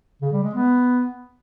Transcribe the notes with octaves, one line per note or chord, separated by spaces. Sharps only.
C#3
G3
G#3
B3